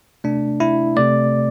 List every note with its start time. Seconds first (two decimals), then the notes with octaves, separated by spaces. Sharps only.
0.24 C3 A3 D4
0.60 E4
0.96 C3 A3 D5